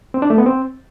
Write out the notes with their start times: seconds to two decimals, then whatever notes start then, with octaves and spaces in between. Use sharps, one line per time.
0.14 C4
0.22 D4
0.30 A3
0.38 B3
0.46 C4